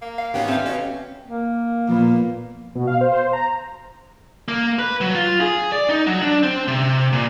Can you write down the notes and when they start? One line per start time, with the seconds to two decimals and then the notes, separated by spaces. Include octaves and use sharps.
0.02 A#3
0.18 F5
0.34 G#1 B3 C#4 G4
0.48 A3 C4 F5
0.66 B2 C#4
1.28 A#3
1.89 A#2 F3 B3
2.75 B2
2.87 F5
3.01 C5
3.33 A#5
4.48 A#3
4.79 B4
5.01 F#3
5.15 F4
5.41 G#4
5.72 D5
5.89 D#4
6.07 F#3
6.22 D4
6.43 C4
6.68 C3
7.13 A#2